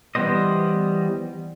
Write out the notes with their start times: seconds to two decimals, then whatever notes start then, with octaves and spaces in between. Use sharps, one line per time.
0.15 E3 G3 B3 C5 D#5